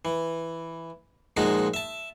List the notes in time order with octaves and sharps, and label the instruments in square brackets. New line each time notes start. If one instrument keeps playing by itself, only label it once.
[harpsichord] E3
A#2 F3 G#3 D#4 F#4
E5 A5